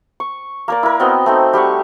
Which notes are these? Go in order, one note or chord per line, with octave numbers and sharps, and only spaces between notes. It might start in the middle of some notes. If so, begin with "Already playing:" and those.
C#6
A#3 A#4 D5
E4 A#4
B3 C4 F#4 D#5
A3 C4 D#4
G3 G4 F#5 C#6